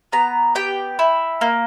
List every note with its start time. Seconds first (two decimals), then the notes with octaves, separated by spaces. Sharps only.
0.12 B3 A#5
0.55 G4 G5
0.99 E4
1.41 A#3